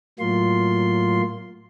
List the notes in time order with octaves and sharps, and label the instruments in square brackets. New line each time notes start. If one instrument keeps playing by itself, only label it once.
[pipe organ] A2 F#3 A#3 F4 C6